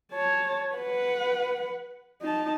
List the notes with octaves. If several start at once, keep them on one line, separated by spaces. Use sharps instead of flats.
C#5 A5
B4 F#5
D#4 A5